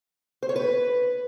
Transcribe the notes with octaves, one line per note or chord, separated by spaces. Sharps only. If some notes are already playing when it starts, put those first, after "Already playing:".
C5
C#5
B4